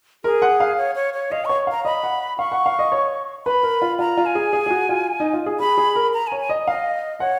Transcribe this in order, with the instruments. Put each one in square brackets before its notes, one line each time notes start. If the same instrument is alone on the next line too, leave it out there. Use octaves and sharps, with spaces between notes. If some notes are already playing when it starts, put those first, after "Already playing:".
[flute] G#4 [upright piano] A#4
[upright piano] F#5
F5
[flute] C#5
C#5
C#5
[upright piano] D#5 [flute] F5
[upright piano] C#5 [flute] C#6
[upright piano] F5 [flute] A#5
[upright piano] D#5 [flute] B5
[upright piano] F#5
[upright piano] F5 [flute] C#6
[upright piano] F#5
F5
D#5
C#5
[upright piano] B4 [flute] B5
[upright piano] A#4
F4
[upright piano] F4 [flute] A#5
[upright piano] F4
[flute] G#5
[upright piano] G#4
G#4
G#4
F#4
F4
D#4
F4
G#4
[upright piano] G#4 [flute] B5
[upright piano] G#4
A#4
[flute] A#5
G#5
[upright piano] C#5
[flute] G#5
[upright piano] D#5
[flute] D#5 [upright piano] F5
[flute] C#5 [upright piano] F#5